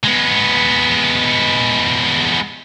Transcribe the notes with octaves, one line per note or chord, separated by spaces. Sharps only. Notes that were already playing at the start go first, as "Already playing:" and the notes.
G#3 B3